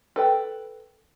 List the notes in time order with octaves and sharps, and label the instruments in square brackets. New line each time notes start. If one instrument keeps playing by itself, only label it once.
[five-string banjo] A4 B4 G5